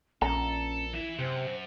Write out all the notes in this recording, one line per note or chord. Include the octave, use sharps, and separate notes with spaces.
A#1 C#4 A4 A#5
E3 E4 E5
F#2 C3 C5